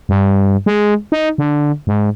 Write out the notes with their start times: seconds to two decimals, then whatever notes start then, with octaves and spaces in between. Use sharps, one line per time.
0.09 G2
0.66 G#3
1.12 D#4
1.38 D3
1.87 G#2